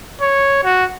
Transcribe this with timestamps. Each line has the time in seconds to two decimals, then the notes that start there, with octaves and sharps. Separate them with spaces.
0.21 C#5
0.64 F#4